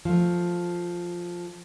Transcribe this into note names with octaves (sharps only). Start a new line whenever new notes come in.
F3 A3